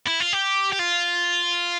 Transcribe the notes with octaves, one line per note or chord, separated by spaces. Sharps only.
E4
F4
G4
G4
F4